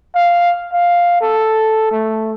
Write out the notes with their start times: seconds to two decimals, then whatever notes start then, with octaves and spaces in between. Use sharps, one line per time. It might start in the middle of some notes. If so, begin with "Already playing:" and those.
0.15 F5
0.73 F5
1.21 A4
1.91 A3